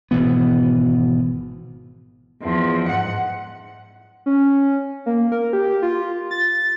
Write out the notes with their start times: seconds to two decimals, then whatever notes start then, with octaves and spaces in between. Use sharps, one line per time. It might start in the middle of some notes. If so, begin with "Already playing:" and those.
0.11 G#1 B2 E3 B3
2.43 E2 F3
2.89 G#2 F#5
4.26 C#4
5.06 A#3
5.32 A#4
5.53 G4
5.82 F4
6.31 A6